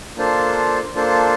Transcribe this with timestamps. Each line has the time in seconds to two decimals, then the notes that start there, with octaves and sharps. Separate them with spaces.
0.17 A#3 D4 F4 A4 C5
0.95 A#3 D4 F4 A4 C5